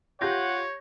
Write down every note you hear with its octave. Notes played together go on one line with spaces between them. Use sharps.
F4 G4 C#5 F#5 G6 A#6